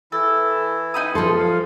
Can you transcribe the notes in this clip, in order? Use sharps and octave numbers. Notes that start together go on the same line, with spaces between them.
E3 E4 A4
D#4 B5 D#6
F3 A4 C6
F5